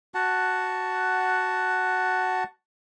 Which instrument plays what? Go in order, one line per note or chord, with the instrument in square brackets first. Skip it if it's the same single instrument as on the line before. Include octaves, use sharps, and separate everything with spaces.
[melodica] F#4 F#5 A5